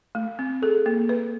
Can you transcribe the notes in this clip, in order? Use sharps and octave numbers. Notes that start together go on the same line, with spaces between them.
A3
C4
G#4 A4
A#3
B4